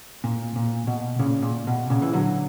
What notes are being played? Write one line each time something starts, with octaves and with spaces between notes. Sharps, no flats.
A#2
A#2
B2
A#2 C#3
A#2
B2
A#2 C#3
E3
D3 F#3